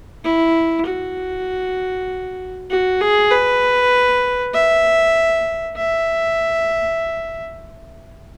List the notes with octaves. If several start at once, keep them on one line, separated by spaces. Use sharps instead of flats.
E4
F#4
F#4
G#4
B4
E5
E5